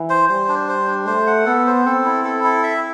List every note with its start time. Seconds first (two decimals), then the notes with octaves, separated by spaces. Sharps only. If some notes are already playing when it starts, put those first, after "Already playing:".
Already playing: E3
0.10 C5
0.29 G3 C5
0.48 D4
0.69 C5
0.87 D4
1.07 A3 C5
1.27 F#5
1.46 B3 A4
1.67 C5
1.85 C4 A4
2.05 E4
2.25 A4
2.44 E4
2.63 E5